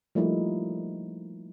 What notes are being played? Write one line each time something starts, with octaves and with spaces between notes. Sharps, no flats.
F3 G3 A3 A#3 D#4 E4